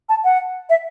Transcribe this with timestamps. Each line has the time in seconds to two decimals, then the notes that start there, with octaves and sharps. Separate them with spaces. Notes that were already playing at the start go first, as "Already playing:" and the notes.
0.09 A5
0.24 F#5
0.70 E5